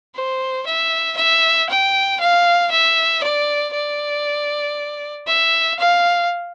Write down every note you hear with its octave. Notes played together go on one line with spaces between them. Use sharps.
C5
E5
E5
G5
F5
E5
D5
D5
E5
F5